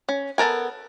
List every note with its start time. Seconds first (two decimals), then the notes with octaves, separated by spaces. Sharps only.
0.09 C#4
0.38 B3 A4 A#4 G#5